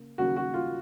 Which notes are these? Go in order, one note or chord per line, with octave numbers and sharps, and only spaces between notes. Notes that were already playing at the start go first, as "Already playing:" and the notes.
Already playing: C#3 A#3
D#2 C#3 F#3 A#3 F#4
F#4
F4